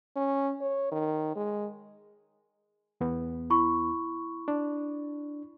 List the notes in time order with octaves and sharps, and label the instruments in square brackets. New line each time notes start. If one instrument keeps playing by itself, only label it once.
[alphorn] C#4
C#5
D#3
G#3
[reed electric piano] E2 B3
[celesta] E4 B5 C#6
[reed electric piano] D4